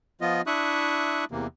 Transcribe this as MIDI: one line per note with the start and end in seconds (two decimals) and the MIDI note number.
0.21 0.41 53
0.21 0.41 59
0.21 0.41 65
0.21 0.41 75
0.47 1.25 62
0.47 1.25 64
0.47 1.25 76
0.47 1.25 85
0.47 1.25 87
0.47 1.25 90
1.31 1.47 40
1.31 1.47 48
1.31 1.47 52
1.31 1.47 58